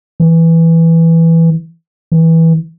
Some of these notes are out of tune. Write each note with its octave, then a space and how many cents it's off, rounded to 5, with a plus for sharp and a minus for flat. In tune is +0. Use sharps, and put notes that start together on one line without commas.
E3 +0
E3 -15